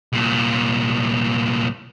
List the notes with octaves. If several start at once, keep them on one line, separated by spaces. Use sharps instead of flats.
C2 A#2